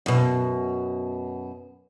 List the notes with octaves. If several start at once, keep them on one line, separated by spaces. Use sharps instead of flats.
F#2 B2